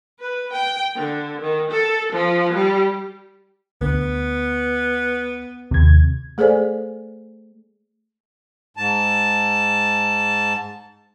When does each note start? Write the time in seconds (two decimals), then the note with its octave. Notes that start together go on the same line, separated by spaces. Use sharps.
0.20 B4
0.53 G5
0.95 D3
1.41 D#3
1.71 A4
2.13 F3
2.53 G3
3.81 D2 B3
5.71 D#2 C3 G#6
6.38 A3 G#4 A4 C5 D5 G#5
8.77 G#2 A5